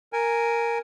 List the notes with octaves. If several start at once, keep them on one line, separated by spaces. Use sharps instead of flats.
A#4 G#5